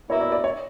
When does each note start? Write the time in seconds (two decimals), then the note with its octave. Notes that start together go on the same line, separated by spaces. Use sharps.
0.09 B2 A#3 E4 C#5
0.21 D5
0.32 D5
0.44 C#5